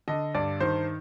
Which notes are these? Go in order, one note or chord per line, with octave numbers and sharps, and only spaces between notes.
D3 D#5
G2 D5
D#3 C5